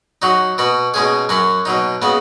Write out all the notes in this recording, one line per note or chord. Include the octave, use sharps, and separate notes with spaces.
F#3 D#4 F#4
B2 B3 F#4
B2 G#3 C#4 G#4
F#2 F#3 C#4 F#4
B2 F#3 D#4
C#3 G#3 B3 F#4